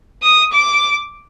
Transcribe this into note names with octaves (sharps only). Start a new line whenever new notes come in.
D#6
D6